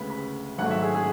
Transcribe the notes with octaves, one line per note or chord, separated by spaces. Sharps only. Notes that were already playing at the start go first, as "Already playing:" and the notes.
Already playing: D2 C#3 G#3 B3 B5
B5
G#1 G#2 F#3 A3 F#5
E5
G#4
G#4